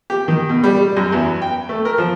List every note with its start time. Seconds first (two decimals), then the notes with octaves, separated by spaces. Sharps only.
0.10 G4
0.28 D#3
0.49 B2
0.64 G3
0.79 G3
0.97 F#2
1.12 E2
1.42 G5
1.69 A3
1.85 A#4
1.98 F3